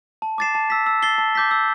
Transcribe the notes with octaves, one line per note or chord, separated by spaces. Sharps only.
A5
D6 A6 C7 E7
A5
E6 B6
E6
A6 C7 G7
A5
D6 G6 B6
E6